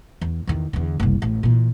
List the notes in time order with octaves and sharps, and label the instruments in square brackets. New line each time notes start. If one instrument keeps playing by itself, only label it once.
[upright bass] E2
E2 D#3
E2 D3
F#1 C2
A1
A#2 E3